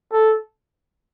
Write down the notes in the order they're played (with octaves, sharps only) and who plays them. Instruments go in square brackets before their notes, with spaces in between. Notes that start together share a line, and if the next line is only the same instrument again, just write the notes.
[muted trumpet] A4